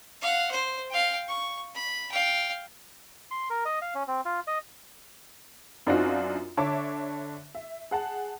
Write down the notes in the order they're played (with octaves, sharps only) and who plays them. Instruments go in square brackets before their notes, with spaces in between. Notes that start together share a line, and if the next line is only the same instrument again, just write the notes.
[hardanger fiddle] F5 F#5
C5
F5 G5
C#6
B5
F5 G5
[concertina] C6
A#4
D#5
F5
C#4
C4
F4
D#5
[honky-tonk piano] F#2 C4 D4 D#4 F4 F#4
D3 C#5 E5 A5 D6
E5
G#4 F#5 A5